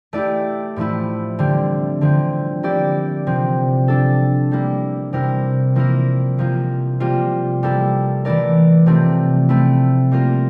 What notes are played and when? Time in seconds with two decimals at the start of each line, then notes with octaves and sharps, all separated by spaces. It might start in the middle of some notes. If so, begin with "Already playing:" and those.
0.13 A3 E4 G4 D5
0.76 A2 F3 A3 E4
1.39 D3 G3 C4
2.01 D3 F3 C4
2.63 A#3 E4 G4 D5
3.26 C3 F3 C4
3.88 G3 D4 A4
4.51 G3 A#3 E4
5.13 C3 G3 C4 E4 A#4
5.75 F3 A#3 E4 A#4
6.38 C3 F3 A#3 F4
7.00 C3 G3 A#3 F4
7.63 G3 A#3 E4 A4
8.25 E3 A3 E4 A#4 D5
8.86 C3 F3 A3 C4
9.49 A3 C4 E4
10.11 G3 A#3 F4 A#4